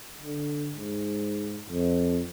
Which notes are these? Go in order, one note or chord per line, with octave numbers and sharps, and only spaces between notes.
D3
G#2
F2